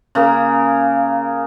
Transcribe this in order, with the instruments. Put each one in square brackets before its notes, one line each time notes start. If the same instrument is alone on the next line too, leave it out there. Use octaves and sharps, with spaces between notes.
[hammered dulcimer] C#3 A#3 G#4